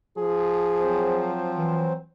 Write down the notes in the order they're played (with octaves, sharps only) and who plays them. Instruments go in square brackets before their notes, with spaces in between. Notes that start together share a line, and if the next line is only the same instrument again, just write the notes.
[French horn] F3 [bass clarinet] G#4
[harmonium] F#3 C4 C5
[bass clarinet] E3